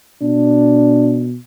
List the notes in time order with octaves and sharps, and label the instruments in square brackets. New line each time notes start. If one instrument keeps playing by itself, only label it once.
[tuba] B2 [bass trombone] D4